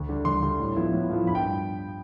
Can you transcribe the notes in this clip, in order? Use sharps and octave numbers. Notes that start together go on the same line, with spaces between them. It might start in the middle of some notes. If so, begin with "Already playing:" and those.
Already playing: D2
D3 G3
D2 C6
D3 G3
A2
F3 B3 E4
A2
F3 B3 E4
G2 B5
G5